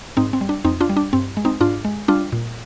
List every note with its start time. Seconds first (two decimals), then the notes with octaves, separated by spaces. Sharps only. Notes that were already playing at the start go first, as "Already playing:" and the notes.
0.17 G#2 C4 D#4
0.33 C4
0.41 G3
0.49 D4
0.65 F2 C4 D#4
0.81 D4 F4
0.89 G3
0.97 D4
1.13 G2 C4
1.37 G#3
1.45 C4 D#4
1.61 G#2 D4 F4
1.85 G#3
2.08 G3 D4 F4
2.33 A#2